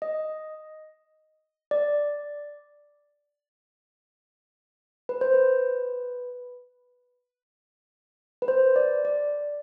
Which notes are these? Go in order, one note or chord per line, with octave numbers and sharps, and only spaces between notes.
D#5
D5
B4
C5
B4
B4
C5
D5
D5